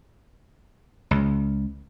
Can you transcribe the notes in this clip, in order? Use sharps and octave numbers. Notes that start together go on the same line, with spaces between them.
C#2